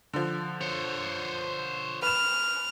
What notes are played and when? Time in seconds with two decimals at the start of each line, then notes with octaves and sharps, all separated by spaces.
0.13 D3 F3
0.61 C5 C#5
2.02 B4 F6 E7